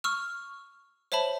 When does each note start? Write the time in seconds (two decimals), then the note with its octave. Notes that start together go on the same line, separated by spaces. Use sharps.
0.04 C#6 E6 F6
1.12 C5 C#5 E5 A5 B5